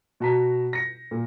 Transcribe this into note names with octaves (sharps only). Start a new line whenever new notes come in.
B2 F#4 A5 A#5 B6
A#6 C#7
A#2